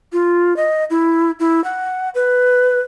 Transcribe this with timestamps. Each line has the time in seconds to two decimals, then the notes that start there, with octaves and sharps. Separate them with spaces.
0.13 F4
0.57 D#5
0.90 E4
1.40 E4
1.64 F#5
2.15 B4